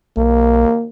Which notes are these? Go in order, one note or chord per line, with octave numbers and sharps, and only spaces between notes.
B1 A#3